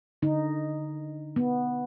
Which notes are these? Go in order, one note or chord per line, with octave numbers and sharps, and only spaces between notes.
D3 D#4
B3